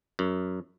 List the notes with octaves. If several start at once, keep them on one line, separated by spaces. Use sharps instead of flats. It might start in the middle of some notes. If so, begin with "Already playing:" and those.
F#2